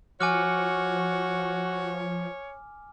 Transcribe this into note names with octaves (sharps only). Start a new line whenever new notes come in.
F3 F#4 C#5 G#5 D6 F6